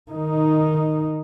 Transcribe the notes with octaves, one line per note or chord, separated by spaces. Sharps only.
D#3 D#4